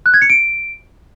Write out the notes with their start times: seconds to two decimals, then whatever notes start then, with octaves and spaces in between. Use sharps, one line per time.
0.06 F#6
0.14 G#6
0.22 C#7
0.30 D7